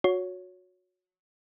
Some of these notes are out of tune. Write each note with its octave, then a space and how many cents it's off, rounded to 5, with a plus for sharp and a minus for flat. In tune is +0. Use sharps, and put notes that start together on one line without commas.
F#4 -25 C#5 +10